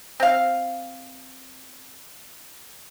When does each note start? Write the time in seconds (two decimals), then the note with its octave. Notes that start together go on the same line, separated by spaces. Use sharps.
0.20 C4 F5